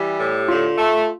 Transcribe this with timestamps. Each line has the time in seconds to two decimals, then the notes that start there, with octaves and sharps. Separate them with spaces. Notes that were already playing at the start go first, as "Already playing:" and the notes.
Already playing: E3 G3 G4
0.20 A2
0.48 D3 F4
0.77 A3